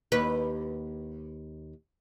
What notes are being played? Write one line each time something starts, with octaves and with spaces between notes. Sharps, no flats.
D#2 B4